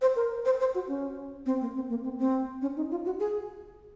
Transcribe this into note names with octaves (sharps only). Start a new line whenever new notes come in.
C5
A#4
C5
C5
F#4
C#4
C4
A#3
C4
A#3
C4
C4
C#4
D#4
F4
F#4
G#4